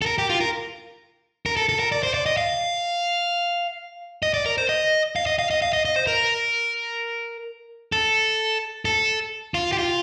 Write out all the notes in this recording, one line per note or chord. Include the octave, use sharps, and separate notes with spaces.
A4
A#4
G4
F4
A#4
A#4
A4
A4
A#4
D5
C5
D5
D#5
F5
D#5
D5
A#4
C5
D#5
F5
D#5
F5
D#5
F5
D#5
D#5
C5
A#4
A4
A4
F4
G4
F4